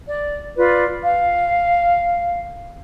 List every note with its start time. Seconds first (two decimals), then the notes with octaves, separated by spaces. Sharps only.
0.08 D5
0.57 F4 B4 D5
1.02 F5